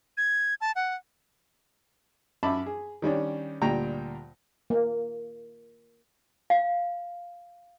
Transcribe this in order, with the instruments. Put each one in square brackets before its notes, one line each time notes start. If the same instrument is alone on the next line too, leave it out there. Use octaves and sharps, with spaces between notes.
[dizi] G#6
A5
F#5
[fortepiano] F#2 E5 A5 B5 D6
G#4
D#3 G3 C#4 D4
D2 A#2 G3 G5 A#5
[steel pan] A#3
[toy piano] F5